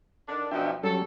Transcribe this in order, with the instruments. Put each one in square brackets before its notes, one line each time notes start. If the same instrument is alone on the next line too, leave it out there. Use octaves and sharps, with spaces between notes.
[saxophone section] D3 D#3 D4
[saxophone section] F#2 B2 F3 [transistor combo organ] D4 E5 G5
[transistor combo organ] F#3 G3 C#4 [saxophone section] A4